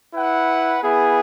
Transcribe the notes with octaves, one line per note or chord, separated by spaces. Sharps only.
E4 B4 F#5
B3 E4 G#4